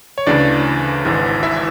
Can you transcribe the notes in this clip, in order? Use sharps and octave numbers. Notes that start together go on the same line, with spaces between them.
C#5
D2 C#3 E3 D4 D5
G#1 G#2 E3
E4 E5